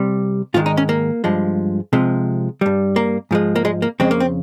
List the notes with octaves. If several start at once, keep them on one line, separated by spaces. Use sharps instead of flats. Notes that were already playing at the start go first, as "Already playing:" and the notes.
Already playing: C3 G3
G#2 D#3 G#3 F4
D#4
C#4
A#3
G2 F3 G#3
C3 F3 G#3
G2 G3
A#3
G#2 F3 G#3
A#3
G#3
A#3
F2 C#3 G#3 C4
A#3
C4